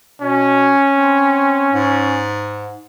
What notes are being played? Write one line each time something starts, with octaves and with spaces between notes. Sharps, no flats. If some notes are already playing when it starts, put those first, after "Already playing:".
B2 C#4
C4
G#2